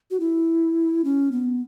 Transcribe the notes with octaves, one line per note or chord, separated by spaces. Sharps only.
F#4
E4
C#4
B3